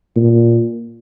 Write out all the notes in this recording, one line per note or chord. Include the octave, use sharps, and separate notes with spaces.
A#2